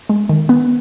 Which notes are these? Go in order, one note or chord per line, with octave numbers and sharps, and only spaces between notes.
G#3
D#3
B3